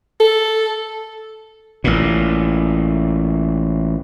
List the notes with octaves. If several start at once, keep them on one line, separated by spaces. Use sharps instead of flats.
A4
A1 A#2